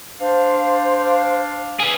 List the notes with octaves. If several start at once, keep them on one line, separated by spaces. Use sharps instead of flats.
D4 C5 F5
G#4 B4